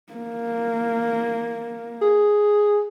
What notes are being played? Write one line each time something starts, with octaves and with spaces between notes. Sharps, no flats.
A#3
G#4